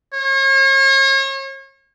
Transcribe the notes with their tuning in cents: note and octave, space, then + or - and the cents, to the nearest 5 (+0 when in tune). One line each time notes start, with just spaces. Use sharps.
C#5 -40